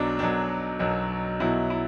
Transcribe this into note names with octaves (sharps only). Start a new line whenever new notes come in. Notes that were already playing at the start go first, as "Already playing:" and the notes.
Already playing: B1 B2 F#3 D4
B1 B2 F#3 D4
B1 B2 F#3
B1 B2 F#3 E4
E4